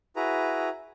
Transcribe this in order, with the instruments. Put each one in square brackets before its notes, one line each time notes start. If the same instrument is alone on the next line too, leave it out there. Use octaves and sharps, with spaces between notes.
[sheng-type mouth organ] E4 F#4 G#4 B4 A#5